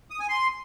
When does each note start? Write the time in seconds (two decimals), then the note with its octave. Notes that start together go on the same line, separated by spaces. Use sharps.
0.10 D#6
0.20 G#5
0.29 C6